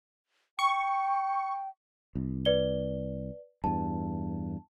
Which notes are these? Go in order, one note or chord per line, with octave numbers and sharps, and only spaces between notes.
G5 C#6
C2
B4 D5 G7
E2 G2 A5